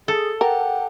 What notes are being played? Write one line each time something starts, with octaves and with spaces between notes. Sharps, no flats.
G#4 A4
G4 A#4 F#5